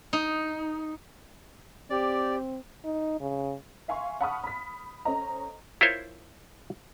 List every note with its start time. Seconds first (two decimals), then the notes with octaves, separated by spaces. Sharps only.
0.13 D#4
1.90 C4 G4 D5
2.85 D#4
3.20 C#3
3.88 E5 F5 G#5 C6 C#6
4.21 F#5 A5 B5 C#6 D#6 F6
4.44 B5 B6
5.05 C#4 A4 C5 D#5 A#5
5.81 E4 F4 A#4 C5 C#5